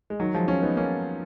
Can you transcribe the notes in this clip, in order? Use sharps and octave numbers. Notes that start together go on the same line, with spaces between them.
G#3
D#3 F#3
F3 G#3
C#4 F4
B3 D#4
A#3 C#4